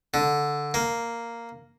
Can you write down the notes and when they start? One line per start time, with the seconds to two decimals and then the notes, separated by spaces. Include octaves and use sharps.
0.14 D3
0.74 A#3